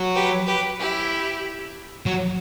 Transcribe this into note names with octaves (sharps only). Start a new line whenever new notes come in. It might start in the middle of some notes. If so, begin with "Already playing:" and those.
Already playing: F#3
G4 B4
G4 B4
E4 G4
F#3